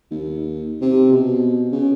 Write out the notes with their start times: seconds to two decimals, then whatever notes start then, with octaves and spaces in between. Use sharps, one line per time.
0.11 D#2
0.81 C3
1.12 B2
1.72 C#3